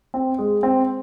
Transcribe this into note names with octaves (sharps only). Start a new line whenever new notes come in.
C4
G#3
C4